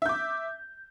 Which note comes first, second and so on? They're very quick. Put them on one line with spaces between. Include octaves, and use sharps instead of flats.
E5 G6 D6